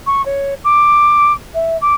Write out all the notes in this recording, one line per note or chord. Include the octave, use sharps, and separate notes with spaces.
C#6
C#5
D6
E5
D6